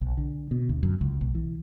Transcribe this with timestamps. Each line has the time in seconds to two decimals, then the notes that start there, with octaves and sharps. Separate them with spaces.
0.01 B1
0.17 D3
0.51 B2
0.69 D2
0.83 F#2
1.01 C#2
1.21 B1
1.35 E3